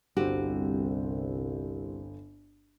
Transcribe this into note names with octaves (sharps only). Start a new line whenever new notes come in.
G1 C2 C4 F#4 G4